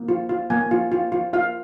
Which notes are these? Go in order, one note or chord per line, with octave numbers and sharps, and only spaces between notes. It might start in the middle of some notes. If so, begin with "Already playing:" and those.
Already playing: A#3
F4
F4
A#3 G#5
F4
F4
F4
F4 F5